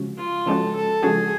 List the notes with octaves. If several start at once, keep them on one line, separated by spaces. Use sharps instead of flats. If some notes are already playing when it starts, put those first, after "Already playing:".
Already playing: C#3 F3 G#3 C#4 F#4
F4
C#3 F3 G#3 C#4 F#4 A4
A4
C#3 F3 G#3 C#4 F#4 G#4